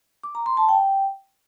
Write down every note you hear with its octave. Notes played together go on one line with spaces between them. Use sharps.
D6
A#5
C6
A5
G5